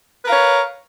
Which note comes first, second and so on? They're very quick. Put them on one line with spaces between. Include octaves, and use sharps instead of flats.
B4 A#4 F5 C#5